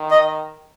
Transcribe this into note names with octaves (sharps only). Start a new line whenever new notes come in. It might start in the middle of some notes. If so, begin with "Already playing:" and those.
Already playing: D#3
D#5